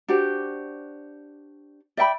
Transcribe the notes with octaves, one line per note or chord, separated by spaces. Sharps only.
D4 F#4 G4 C5
D5 E5 G5 B5